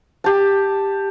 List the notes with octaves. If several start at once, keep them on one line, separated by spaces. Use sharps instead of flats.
G4 A5